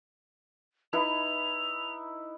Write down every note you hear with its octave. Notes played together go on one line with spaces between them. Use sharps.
D#4 E4 B4 F7